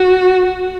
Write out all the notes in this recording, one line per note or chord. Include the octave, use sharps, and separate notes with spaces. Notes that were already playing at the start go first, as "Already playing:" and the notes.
Already playing: F#4
F#4